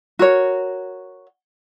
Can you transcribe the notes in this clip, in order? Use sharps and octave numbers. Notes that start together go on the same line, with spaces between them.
F#4 A#4 C#5